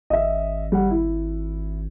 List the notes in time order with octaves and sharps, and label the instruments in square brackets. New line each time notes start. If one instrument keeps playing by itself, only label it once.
[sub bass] G#1 [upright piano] D#5 E5
[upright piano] G3 F#5
E4